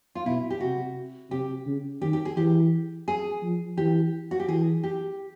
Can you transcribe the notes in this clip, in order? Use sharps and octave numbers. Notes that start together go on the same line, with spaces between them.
F4
B2 E4
G4
C3 F#4
C3 G4
C#3
D#3 G4
G4
G#4
E3 G4
G#4
F3
E3 G4
F#4
G4
E3 G#4
G4